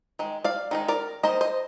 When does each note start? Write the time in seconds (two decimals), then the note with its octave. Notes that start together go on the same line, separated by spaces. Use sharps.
0.19 D#3 G#3
0.44 D5 F5
0.71 D#3 G#3 D#4
0.88 A#4 D5
1.23 D#3 A#3 D#4 C5 D#5
1.41 C5 D#5